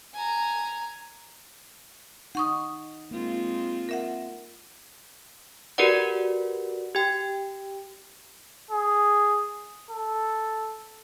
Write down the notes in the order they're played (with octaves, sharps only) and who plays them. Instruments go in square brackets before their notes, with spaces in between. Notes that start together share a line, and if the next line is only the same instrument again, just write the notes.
[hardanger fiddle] G#5 A#5
[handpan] D#4 [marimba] F#5 C#6 D#6
[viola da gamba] G#3 C4 F4 [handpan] A#3
[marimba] A#4 E5 F#5
[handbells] F#4 G4 A#4 B4 D5 F#5
G4 G5
[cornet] G#4
A4